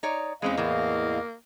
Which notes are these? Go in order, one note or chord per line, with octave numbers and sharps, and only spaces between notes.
D#4 C#5 D5
E2 E3 G#3 C4 C#4 D#5 F5
A2 E3 A#3